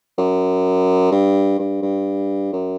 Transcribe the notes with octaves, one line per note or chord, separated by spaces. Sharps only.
F#2
G2
G2
G2
F#2